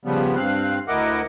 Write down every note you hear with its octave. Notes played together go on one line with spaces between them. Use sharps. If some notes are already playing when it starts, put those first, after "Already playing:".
C#3 F3 G3 B3
G2 C4 F5 F#6
D2 E4 A#4 D#5 F#5 D6